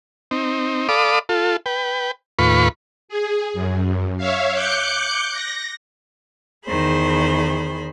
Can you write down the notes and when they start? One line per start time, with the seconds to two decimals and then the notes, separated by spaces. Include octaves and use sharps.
0.31 C4 D#4
0.89 A4 D5 F5 B5 D6 D#6
1.29 F4 A4
1.66 B4 G5
2.39 D#2 A2 F4 B4 B5 C#6
3.09 G#4
3.54 F#2
4.17 C#5 E5 F5
4.52 D6 F#6 G6 C#7
5.32 A#6
6.66 E2 D#3 G#4 C5 B5